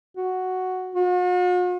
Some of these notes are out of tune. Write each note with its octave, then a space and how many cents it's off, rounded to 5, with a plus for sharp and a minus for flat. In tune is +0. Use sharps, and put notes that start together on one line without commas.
F#4 +0
F#4 -45